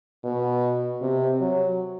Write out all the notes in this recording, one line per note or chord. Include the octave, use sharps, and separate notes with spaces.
B2
C3
F#3